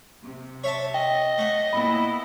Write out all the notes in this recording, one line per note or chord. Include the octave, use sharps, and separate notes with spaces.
C3
C#5 E5 A5
D#5 G5
A3 F#5
A#2 B3 E4 B5